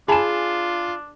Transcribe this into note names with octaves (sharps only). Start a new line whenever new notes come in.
D4 F4 G#4 G#5 A5 B5 E7